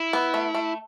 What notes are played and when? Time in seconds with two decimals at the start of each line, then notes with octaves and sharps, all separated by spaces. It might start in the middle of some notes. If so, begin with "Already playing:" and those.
Already playing: E4
0.13 B3
0.34 A3
0.55 A3